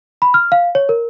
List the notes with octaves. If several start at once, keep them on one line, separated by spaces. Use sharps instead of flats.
B5
F6
F5
C#5
A#4